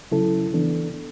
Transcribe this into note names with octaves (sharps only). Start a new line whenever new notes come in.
C#3 F#3 C#4 E4 A4
E3 B3 D4 A4